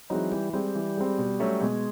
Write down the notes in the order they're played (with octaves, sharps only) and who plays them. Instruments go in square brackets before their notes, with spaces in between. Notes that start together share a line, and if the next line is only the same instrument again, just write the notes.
[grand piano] E3 G#3 C4 D#4 [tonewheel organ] F#3
[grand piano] E3 [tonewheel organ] G3
[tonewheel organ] G3 [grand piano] G#3 C4
[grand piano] E3
G#3 C4
B2
F#3 A3 C#4
[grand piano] B2 [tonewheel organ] G#3